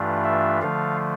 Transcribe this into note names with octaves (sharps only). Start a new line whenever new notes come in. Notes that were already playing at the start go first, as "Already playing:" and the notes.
Already playing: G2 E3 A3 D4 F4
E5
D3 F3 A3 F5